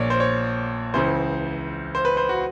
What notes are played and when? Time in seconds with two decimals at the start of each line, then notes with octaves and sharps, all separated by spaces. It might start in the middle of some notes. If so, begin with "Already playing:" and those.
Already playing: A#1 A#2 C#5 D5
0.10 C5
0.20 C#5
0.94 C#2 C#3 E3 C5
1.95 C5
2.05 B4
2.17 C5
2.29 F#4